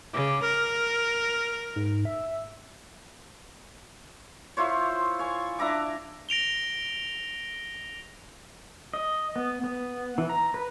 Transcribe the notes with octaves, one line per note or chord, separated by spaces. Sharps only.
C#3 D6
A#4 F6
G#2
E5
E4 F4 C5 C#5
C#5 G#5
D4 E4 A#5 D6
A#6 D7 F7 G7
D#5
B3
B3
E3
A#5
B4